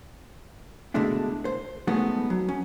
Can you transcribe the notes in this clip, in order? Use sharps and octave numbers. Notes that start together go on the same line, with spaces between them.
B2 D3 G#3 A3 D4 E4
C5
G#3 A3 B3 C#4 D#4 F#4
F#3
C#4